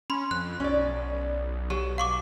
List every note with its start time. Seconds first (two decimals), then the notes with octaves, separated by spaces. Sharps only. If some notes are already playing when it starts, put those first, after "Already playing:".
0.10 C#4 B5 C6
0.31 F2 F#6
0.60 B1 C#4 D5
1.70 F#3 G4
1.98 F5 C#6 D6